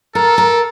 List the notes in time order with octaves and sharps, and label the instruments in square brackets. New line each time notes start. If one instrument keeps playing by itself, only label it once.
[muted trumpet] A4 [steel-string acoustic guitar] A#4
[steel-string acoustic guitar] A#4